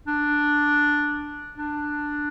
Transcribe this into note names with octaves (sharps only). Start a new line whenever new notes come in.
D4
D4